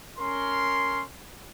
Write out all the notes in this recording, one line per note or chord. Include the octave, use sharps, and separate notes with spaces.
C#4 A#4 C6